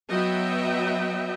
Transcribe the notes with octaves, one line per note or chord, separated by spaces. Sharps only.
F#3 B3 D#5 E5 G5